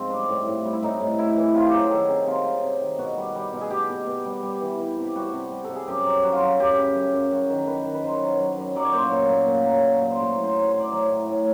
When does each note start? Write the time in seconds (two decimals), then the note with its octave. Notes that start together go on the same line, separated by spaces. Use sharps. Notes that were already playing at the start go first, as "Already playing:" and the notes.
Already playing: G#2 F3 C4
0.10 G3 D4
0.29 A2
0.47 A2
0.65 G3
0.73 E4
0.83 A2 D#4
1.00 A2
1.18 A2 E4
1.37 E3
1.54 C3 F4
1.66 G4
1.72 F#3 G#4
1.91 D#3 A4
2.09 C3 G#4
2.27 C3 F4
2.45 F#3
2.63 C3
2.80 D#3
2.99 B2 F#4
3.17 G3
3.35 G3
3.53 B2
3.61 G#4
3.70 G3 G4
3.89 B2
4.07 B2
4.26 G3
4.43 G3
4.61 E3
4.79 E3
4.97 C3
5.04 G4
5.16 G3 F#4
5.33 C3
5.51 G3
5.64 C3 A4
5.76 G#4
5.87 F#2 G4
6.05 F#3
6.23 F#3 F#4
6.32 F4
6.41 F#3 F#4
6.59 F#2 G4
6.77 C#3
6.95 F#2
7.14 F#2
7.31 F#2 F#4
7.50 D#3
7.67 D#3 B4
7.86 D#3
7.94 B4
8.03 F#3 C5
8.21 F#3
8.40 F#3
8.58 F#2
8.76 F#3 D5
8.85 C#5
8.93 A#2 C5
9.02 C#5
9.11 A#2
9.30 A#2
9.48 A#2
9.66 F#3
9.84 A#2
10.02 F#3
10.10 C5
10.20 A2 C#5
10.38 F#3
10.44 C5
10.56 F#3
10.62 C#5
10.68 C5
10.74 A2
10.80 D5
10.92 F#3 C#5
11.09 A2
11.28 A2